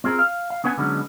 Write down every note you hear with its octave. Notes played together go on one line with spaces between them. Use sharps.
C4 F4 G#4 A#4
F5
F5
B3 C#4 B4 F#5 G#5
D3 F#3 G#3 B3 C#4 D#4